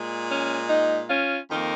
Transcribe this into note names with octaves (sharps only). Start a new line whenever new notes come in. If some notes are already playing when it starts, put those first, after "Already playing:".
Already playing: A#2 G#3
C#4
D#4
C#4 F4
F2 D#3 A#3